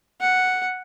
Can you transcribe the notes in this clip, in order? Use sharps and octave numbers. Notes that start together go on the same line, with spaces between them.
F#5